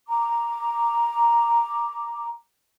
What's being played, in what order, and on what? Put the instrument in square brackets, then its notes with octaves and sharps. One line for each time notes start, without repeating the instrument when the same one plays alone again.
[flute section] A#5 D6